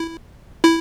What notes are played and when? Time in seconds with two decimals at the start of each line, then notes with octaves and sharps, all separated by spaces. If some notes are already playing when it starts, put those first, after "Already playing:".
Already playing: E4
0.64 E4